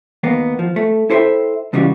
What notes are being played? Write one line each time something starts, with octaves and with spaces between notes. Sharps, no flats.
D#2 A#3 B3
F3
A3
E4 A4 C5 D5 E5 G5
C#2 C#3 E3 G3 F4 F#4